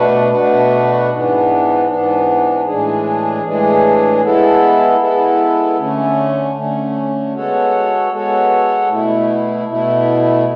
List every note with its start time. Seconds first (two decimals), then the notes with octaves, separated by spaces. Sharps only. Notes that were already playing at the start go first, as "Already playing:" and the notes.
Already playing: B2 A3 D4 F#4 B4
0.31 B2 A3 D4 F#4 B4
1.10 G#2 E3 B3 D4
1.88 G#2 E3 B3 D4
2.65 A2 E3 G#3 D4 G#4
3.43 A2 E3 G#3 D4 G#4
4.21 G#3 B3 E4 A4
4.99 G#3 B3 E4 A4
5.77 D3 A3 C#4
6.55 D3 A3 C#4
7.33 G#3 B3 F#4 A4 C#5
8.11 G#3 B3 F#4 A4 C#5
8.89 B2 A3 E4
9.67 B2 A3 E4